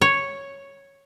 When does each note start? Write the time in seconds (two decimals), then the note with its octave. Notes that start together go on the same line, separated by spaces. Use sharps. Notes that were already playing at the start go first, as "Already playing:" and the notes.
0.01 C#5